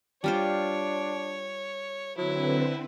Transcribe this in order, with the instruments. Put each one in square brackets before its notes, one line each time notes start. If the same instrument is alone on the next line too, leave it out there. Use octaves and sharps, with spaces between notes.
[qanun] G3 F4 C5 [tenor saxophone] D4 [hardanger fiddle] C#5
[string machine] D3 C4 B4 [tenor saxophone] F#3 [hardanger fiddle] E4